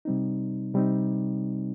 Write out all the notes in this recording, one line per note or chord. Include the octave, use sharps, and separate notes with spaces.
C3 G3 C4 D#4
C3 G3 C4 D#4